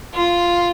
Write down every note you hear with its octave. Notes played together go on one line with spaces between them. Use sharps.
F4